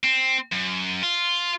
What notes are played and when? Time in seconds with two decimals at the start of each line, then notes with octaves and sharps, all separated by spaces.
0.03 C4
0.52 F#2
1.03 F4